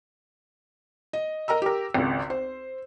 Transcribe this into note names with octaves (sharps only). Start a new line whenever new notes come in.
D#5
A#4 D#5 A#5 E6
G4 A#4
G#1 C#2
C5